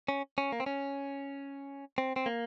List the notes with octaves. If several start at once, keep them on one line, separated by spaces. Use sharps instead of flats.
C#4
C#4
A#3
C4
C#4
C4
C4
A#3